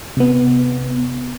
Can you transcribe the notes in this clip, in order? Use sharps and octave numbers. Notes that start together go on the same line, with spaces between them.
C3 B3